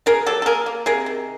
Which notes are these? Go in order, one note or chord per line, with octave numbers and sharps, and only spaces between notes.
B2 G#4 A#4
F#3 G4 A4
A4
A#3 G#4 A#4
A#3
C3 G#4 A#4
D#3